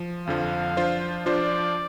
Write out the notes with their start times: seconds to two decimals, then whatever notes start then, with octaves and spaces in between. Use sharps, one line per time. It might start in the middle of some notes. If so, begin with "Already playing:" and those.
Already playing: F3
0.27 F2 D3 F3 F5
0.77 F3 D4 F4 C5
1.26 F3 D4 F4 C5 D5